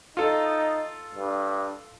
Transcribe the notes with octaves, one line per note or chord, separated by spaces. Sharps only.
D#4 F4 A4
G2